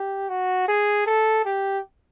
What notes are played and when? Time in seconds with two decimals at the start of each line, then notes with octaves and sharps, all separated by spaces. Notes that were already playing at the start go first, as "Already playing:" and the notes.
Already playing: G4
0.29 F#4
0.68 G#4
1.06 A4
1.45 G4